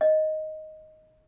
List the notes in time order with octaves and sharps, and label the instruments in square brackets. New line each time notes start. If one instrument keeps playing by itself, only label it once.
[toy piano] D#5